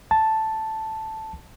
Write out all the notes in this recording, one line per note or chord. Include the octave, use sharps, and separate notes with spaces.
A5